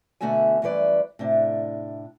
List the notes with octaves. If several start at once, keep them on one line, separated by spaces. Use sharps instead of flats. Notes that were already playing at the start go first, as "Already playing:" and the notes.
B2 D3 A3 F#4 E5 G#5
F#2 E3 G3 B4 D5
A2 C3 D4